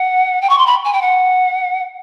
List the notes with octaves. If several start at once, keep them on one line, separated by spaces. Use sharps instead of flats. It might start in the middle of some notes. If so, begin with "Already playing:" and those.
Already playing: F#5
G5
C#6
C6
B5
G#5
G5
F#5